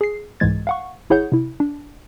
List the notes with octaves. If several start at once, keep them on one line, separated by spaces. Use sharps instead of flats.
G#4 C7
C2 G#2 E3 G#3 G#6 A6
F5 F#5 C#6
G#1 E4 G#4 C#5 F#5 G6
C3 E4
D4